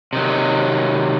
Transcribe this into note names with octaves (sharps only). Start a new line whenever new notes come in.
C3 D#3 F#3